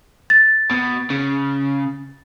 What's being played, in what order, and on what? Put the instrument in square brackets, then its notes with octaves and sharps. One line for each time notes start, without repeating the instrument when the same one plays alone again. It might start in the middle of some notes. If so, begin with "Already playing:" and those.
[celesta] A6
[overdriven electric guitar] B2
C#3